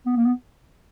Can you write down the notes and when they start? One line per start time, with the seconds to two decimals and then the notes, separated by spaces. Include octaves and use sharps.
0.06 B3
0.16 A#3
0.26 B3